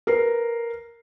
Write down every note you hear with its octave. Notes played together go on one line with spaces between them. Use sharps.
A#4 B4 C7